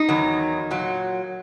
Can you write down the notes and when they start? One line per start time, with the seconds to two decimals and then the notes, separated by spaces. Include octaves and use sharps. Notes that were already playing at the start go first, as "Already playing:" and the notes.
Already playing: D#4
0.09 E2 D#3 F#3
0.71 A#2 F#3